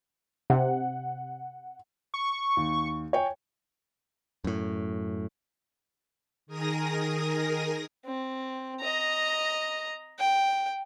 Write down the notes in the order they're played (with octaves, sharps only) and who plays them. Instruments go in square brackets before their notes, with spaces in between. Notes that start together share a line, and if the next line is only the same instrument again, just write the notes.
[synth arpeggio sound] C3 [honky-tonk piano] F#5
[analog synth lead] C#6
[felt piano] D#2
C#5 G5 G#5
[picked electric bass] F#2 A2
[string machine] D#3 G#4 A#4 D#6 A#6
[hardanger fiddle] C4
D#5 A#5
G5